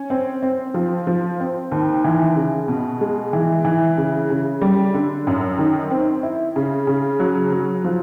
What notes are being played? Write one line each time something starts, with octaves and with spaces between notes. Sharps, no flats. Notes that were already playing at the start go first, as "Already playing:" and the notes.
Already playing: C#4
C4
C4
F3
F3
C4
D#2
E3
C#3
B2
G#3
E3
E3
C#3
C#3
G3
D3
F#2
D#3
C4
E4
C#3
C#3
F#3
F#3
F3